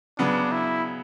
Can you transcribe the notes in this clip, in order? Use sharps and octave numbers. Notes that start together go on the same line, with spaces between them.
C#3 F#3 B3 D4
E4